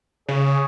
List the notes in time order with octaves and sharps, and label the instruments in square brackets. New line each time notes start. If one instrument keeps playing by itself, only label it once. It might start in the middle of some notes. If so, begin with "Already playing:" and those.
[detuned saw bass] C#3 [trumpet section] G#4 C#5